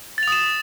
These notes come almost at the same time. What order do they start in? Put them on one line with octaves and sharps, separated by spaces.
A6 F7 D#6 E7